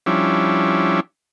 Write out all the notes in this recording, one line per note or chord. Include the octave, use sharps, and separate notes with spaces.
F3 G3 C#4 D4 E4